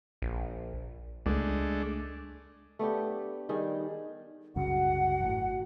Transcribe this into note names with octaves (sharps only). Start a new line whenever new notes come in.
A#1
C#2 G#3 A3 D4
A3 B3 D4 G4
D#3 G3 G#4
C2 F#2 C#3 F#4 F#5
G#1 A2